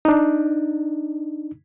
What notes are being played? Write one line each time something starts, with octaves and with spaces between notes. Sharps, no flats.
D4 D#4